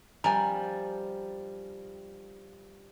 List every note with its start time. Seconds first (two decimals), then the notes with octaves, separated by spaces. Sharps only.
0.24 F3 G3 D4 A#4 G#5